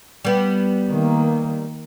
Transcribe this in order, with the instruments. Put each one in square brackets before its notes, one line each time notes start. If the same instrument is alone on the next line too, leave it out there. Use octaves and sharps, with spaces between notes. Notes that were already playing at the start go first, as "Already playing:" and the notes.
[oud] G3 B3
[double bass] D#3 A#3